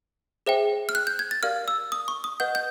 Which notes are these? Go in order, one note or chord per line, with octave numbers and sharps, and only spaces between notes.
G#4 C5 E5 G5
F6
F#6
G6
G#6
A6
G4 A#4 D5 F5 F6
E6
D#6
C#6
D#6
B4 D#5 F#5 G6
G6